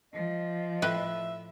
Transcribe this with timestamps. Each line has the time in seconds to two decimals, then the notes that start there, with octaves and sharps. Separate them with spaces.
0.13 F3 D#5
0.82 A2 B4 E5 G5